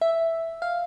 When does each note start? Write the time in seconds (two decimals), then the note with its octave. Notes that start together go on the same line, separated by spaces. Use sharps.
0.01 E5
0.62 F5